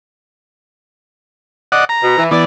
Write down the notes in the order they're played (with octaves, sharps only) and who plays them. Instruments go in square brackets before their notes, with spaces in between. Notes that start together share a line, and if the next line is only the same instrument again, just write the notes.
[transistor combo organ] D5 D#5 F#5
A#5
[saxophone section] B2
E3
[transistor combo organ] E3 B3 [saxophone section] D5